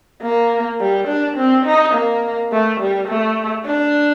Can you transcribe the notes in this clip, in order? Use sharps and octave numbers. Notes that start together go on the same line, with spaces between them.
A#3
G3
D4
C4
D#4
A#3
A3
G3
A3
D4